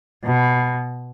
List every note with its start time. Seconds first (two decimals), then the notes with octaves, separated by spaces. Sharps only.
0.24 B2